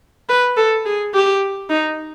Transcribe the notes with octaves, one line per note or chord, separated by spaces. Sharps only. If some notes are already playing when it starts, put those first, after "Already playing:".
B4
A4
G#4
G4
D#4